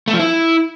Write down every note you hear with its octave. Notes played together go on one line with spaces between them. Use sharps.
A3
F3
E4